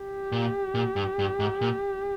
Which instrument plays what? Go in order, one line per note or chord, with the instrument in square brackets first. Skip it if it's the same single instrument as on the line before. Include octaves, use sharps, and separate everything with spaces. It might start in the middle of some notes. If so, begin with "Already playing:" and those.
Already playing: [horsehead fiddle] G4
[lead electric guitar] A#2
A#2
G2
G2
G#2
A#2